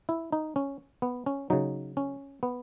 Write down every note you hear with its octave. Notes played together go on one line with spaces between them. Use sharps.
E4
D#4
C#4
B3
C#4
C#3 F#3 D#4
C#4
B3